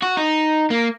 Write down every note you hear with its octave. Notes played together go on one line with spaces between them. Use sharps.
F#4
D#4
A#3